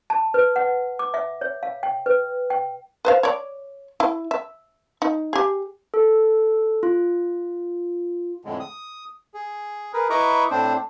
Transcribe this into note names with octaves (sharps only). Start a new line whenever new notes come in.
A5
B4
F#5
D6
E5
C#5
F5
G5
B4
G5
B4 C5 F5
C#5 D5
E4
E5
D#4
G4 G#4
A4
F4
F2 A2 D3 G#3
D#6
G#4
G#4 A#4 B4
E4 B4 D#5 A#5 C#6 D6
A2 C4 D4 C5